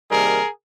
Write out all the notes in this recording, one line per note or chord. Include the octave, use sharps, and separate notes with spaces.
C3 D#3 G3 A#3 G#4 A#4